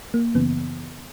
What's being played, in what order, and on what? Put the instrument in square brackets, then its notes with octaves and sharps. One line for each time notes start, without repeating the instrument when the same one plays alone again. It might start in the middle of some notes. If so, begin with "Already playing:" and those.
[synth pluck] A#3
F#2 C#3 E3 B3